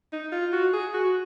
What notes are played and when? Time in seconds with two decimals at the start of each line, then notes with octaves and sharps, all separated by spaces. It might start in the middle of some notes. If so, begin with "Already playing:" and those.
0.13 D#4
0.32 F4
0.53 F#4
0.73 G#4
0.94 F#4